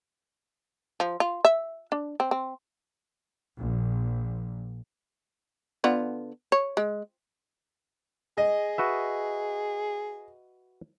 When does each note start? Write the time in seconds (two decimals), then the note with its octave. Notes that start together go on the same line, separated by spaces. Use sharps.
1.00 F3
1.20 F4
1.45 E5
1.92 D4
2.20 C4
2.31 C4
3.59 A#1
5.84 D3 B3 F4
6.52 C#5
6.77 G#3
8.38 G#4 D#5
8.78 F#4 B4 E5